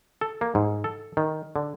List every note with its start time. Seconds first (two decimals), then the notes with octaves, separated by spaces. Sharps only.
0.21 A4
0.41 A#3
0.55 G#2
0.84 A4
1.17 D#3
1.56 D3